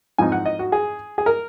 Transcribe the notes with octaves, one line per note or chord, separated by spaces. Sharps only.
G#2 F3 C4 D#4 G#5
F#5
D#5
F#4
G#4
G#4
A#4